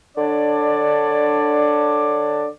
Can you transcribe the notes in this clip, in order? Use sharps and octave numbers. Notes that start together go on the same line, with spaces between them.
D3 D4 C#5 D5